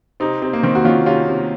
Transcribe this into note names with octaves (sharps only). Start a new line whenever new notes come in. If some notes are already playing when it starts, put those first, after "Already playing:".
C3 C4 D#4
C3 C4
A#3
D#3 C4
F#4
D#3 C#4 F4
C3 C#4 F4
C3